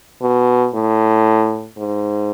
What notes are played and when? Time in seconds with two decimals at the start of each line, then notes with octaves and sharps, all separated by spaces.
0.22 B2
0.74 A2
1.78 G#2